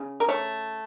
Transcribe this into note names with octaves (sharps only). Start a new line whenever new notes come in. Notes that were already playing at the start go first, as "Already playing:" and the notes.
Already playing: C#3
A#4
A3 C#5